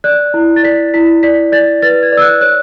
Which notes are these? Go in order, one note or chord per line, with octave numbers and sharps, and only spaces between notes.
D5 F#6
E4
A6
D5 B6
E4 B6
D5 B6
D5 A6
B4 A6
G#6
D5
E6
F#6
C#5 F#6